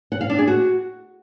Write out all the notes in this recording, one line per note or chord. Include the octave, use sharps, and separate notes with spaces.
F#5
F5
D4
G#4
F#4